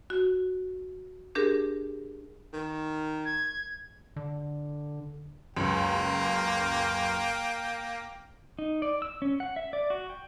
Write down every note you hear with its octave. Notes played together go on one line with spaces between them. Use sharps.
F#4
D4 G4 G#4 A#4
D#3
G#6
D3
C#2 F#2 A#3 G5
D#4
D5
E6
C#4
F#5
E5
D5
F#4
G5